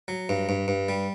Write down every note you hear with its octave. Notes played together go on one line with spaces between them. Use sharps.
F#3
G2
G2
G2
G3